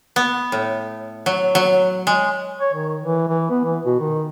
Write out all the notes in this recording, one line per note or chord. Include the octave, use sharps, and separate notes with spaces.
B3
A2
F#3
F#3
G#3
C#5
D#3
E3
E3
B3
E3
B2
D#3